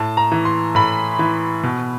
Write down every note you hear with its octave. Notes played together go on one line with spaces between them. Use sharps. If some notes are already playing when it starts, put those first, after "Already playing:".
Already playing: A2 A5
A#5
E3
C6
A2 B5
E3
B2